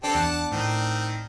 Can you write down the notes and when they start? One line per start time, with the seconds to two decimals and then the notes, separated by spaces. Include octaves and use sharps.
0.04 C4 D4 G4 A4
0.15 E2 F#5 A5
0.52 A2 D#3 C4